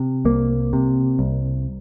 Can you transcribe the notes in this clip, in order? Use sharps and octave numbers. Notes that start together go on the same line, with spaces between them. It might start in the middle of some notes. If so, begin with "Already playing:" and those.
Already playing: C3
C2 A#3
C3
C2